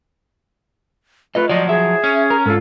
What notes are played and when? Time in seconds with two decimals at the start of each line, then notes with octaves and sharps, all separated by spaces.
1.35 A3 F4 B4 D#5
1.49 F3 F#3 D5 D#5
1.69 G#4 E5
2.04 C#4
2.30 A#4
2.46 G#2 F4 A4